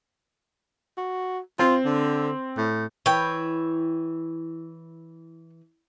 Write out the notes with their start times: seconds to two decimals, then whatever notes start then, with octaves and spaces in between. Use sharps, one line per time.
0.98 F#4
1.59 C4 F4
1.85 D3
2.57 A2
3.06 E3 C#5 G5